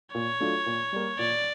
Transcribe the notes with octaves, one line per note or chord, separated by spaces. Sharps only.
A#2 C#5
F#3 A3 D4 F4
A#2
G3 A#3
A#2 D5